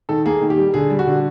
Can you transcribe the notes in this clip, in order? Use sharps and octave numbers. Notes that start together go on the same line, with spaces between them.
D#3 A4
A#3 G#4
D#3
G4
G3
D3 G#4
G3
F#4
D3